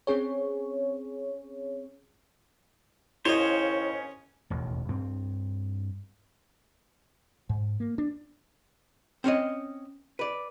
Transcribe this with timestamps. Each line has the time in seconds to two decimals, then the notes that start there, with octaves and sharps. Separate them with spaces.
0.07 C4 C#4 G#4 C#5
3.25 D#2 C#3 C#4 E4 C5 C#5 D#5
4.50 E1 A1 D#2
4.89 G2 C4
7.49 G#2
7.80 A#3
7.98 D4
9.24 C4 C#4 C#5 D#5
10.19 B4 D5